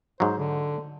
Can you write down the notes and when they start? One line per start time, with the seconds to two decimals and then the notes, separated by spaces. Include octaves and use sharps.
0.20 G#2 F#3 C5
0.38 D3